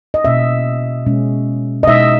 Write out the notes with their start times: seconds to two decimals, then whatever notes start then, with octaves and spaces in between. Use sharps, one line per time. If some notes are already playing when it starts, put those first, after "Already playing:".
0.14 D#5
0.25 B2 A#3 C#4 E5
1.06 B2 G#3 C#4
1.83 D#5
1.88 B2 G#3 D#4 E5